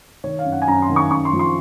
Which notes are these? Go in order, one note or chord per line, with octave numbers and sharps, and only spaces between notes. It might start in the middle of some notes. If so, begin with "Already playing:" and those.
D#3 C#5
F5
F#2
F#5
G#5
F#2 A#5
C6
D#3
C#6
F#2 C#6
C6
F3
C6